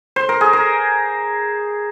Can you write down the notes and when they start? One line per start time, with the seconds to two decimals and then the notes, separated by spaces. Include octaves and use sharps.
0.16 C5
0.29 A#4
0.41 G#4
0.53 A#4